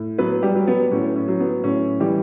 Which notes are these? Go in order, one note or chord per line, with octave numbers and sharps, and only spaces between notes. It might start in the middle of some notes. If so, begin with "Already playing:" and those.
Already playing: A2
F#3 B3 B4
G3 G4
F#3
B3
A2 C#4
C#4
F#3
B3
A2 C#4
E3 G3 G4